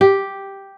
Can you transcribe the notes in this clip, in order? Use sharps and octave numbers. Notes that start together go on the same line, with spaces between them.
G4